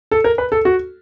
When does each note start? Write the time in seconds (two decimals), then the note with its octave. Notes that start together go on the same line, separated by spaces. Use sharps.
0.11 A4
0.24 A#4
0.38 B4
0.52 A4
0.65 F#4